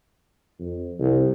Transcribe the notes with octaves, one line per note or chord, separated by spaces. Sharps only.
F2
C2